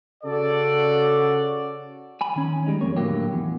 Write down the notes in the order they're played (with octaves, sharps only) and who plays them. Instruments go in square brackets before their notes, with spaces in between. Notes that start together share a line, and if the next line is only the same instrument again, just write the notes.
[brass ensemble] C#3 F#4 A4 D5
[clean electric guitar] G#5 B5
D#3 C#4
G3 G#3 D#4
F2 A#3 C#5
A2 D3 E3 F#3 A#3 G4
E2